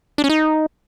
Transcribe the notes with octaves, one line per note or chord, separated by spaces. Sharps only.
D4
C#4
D#4